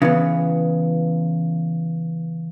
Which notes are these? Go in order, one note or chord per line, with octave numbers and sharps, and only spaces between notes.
C#3 E3 B3